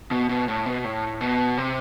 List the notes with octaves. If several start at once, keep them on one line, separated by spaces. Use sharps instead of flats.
B2
B2
A2
B2
A2
B2
C3